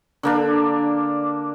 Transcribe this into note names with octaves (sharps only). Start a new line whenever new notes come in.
D3 A#3 D4